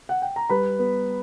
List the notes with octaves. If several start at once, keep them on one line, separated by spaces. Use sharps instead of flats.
F#5
G5
A#5
G3 B4 B5
B3